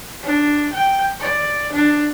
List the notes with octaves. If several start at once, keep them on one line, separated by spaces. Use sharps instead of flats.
D4
G5
D5
D4